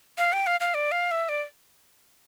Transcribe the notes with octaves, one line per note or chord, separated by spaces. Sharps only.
F5
G5
F5
F5
D5
F5
E5
D5